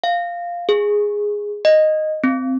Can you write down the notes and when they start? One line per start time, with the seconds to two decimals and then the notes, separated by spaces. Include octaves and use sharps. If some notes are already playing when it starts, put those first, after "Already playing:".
0.04 F5
0.69 G#4
1.65 D#5
2.24 C4